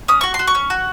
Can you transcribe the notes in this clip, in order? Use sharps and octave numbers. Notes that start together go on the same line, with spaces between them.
C#4 D#6
F#4 C#6
C6
F#4
C#6
C#4
F#4